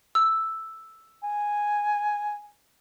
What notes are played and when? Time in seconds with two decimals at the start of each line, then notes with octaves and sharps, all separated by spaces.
0.15 E6
1.23 G#5